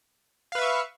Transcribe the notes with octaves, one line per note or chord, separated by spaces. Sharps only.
B4 E5 F5 C#6